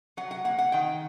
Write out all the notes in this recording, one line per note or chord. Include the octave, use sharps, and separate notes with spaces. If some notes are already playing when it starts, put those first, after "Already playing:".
F#3 F#5
F#5
A#3 F#5
F#5
D#3 G5